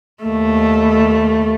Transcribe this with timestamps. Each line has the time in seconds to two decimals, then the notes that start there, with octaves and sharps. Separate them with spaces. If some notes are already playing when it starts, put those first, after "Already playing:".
0.23 D#2 A3